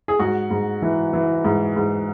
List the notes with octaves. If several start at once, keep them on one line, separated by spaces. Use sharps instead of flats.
G#4
G#2 F#4
G#2
E3
E3
G#2
G#2